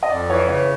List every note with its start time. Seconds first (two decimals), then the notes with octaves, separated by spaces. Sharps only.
0.03 D#5
0.10 F2 D5
0.30 E3 C#5
0.48 C#3 C#5